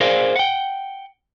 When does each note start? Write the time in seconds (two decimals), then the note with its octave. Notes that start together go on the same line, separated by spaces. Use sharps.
0.01 G#4 A#4 C5 D5 F5
0.36 F#5 G5